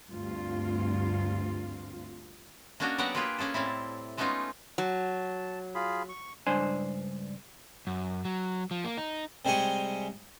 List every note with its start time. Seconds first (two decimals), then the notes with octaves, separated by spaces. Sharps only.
0.10 D2 G2 C4 F4
2.80 A#3 C#4 D4 F#4 C#5 D#5
2.98 F#3 B3 G4 D5 F#5 A#5
3.15 A#3 F4 G4 G#4 B4
3.38 A#3 C#4 G#4 A4
3.54 A2 G3 C4 E4
4.17 G#3 A3 B3 C#4 D#4 F4
4.78 F#3 A5
5.75 F4 G#4 B5
6.09 C#6
6.47 C#2 G2 D4 C5 G#5
7.87 F#2
8.25 F#3
8.71 F3
8.84 A#3
8.98 D#4
9.45 C3 G3 G#3 G#5 C#6